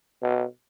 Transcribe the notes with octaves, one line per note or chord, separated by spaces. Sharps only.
B2